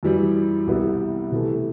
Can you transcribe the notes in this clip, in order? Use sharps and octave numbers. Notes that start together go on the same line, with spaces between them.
F#2 E3 G3
C2 C3 G3 B3 E4
C3 E3 A3